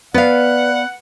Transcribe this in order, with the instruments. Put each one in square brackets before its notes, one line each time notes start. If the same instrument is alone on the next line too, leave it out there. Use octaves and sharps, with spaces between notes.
[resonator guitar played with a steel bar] B3 F5 [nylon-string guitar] B4 [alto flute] D5 [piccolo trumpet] F#5